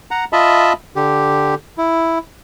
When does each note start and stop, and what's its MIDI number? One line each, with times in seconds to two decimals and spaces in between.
0.11 0.25 78
0.11 0.25 82
0.33 0.73 65
0.33 0.73 75
0.33 0.73 76
0.33 0.73 81
0.33 0.73 83
0.96 1.55 50
0.96 1.55 67
1.78 2.19 64